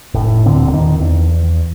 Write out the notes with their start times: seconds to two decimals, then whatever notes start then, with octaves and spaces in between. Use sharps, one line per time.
0.14 F1 A2
0.46 D1 A#2 D3 C4
0.70 E2 D#3
1.00 E2